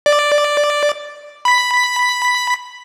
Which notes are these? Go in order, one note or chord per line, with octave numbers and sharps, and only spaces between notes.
D5
B5 B6